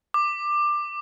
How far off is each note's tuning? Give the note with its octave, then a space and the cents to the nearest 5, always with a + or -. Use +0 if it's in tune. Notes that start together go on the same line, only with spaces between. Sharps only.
D6 +15